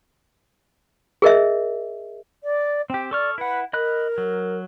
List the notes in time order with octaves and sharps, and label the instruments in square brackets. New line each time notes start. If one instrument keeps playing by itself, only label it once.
[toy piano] G#4 A#4 D#5 E5
[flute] D5
[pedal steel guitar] C4 G4 [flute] G5
[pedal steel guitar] A4 C#6 F6 [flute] D5
[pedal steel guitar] E4 F#5 [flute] B4
[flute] A#4 [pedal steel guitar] D#5 B5 F#6
[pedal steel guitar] F#3